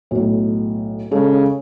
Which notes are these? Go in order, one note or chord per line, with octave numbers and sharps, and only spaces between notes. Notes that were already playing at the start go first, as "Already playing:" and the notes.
B1 A2
C#3 G#3 A4